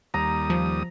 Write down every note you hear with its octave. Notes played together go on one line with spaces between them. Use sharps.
D#2 G3 A#5 D#6
F3